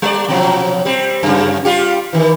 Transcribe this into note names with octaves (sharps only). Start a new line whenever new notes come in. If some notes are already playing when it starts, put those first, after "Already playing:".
G3 D5
B2 F3 F#3
G3 C4
F#2 C#3
G3 F4 G4
D#3 E3